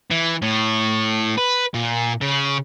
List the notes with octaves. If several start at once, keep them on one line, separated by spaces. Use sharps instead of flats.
E3
A2
B4
A#2
C#3